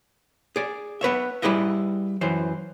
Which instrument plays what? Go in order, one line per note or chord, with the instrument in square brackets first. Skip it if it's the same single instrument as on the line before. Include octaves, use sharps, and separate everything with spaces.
[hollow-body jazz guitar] G#4 D5
B3 B4 C#5 E5
G3 E4 G#4 B4 D#5 E5
F#2 E3 C5